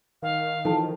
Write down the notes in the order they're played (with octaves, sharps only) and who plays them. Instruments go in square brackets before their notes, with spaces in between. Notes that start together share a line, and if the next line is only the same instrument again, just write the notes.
[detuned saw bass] D#3 [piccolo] F5
[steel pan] E3 F3 D#4 [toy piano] A4 G5 A5